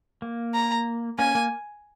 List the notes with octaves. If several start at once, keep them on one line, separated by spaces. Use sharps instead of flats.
A#3
A#5
A#3 C#4 G#5
A#3